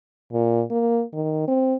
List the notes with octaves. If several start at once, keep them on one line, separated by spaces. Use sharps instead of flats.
A#2
A#3
D#3
C4